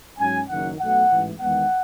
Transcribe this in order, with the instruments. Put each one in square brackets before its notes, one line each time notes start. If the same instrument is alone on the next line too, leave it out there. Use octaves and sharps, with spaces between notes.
[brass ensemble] G#2 F#3 C#4 G#5
F#1 F#2 D#3 F#3 F#5
B1 B2 A3 F#5
A1 G#2 E3
E2 D#3 G#3 B3 F#5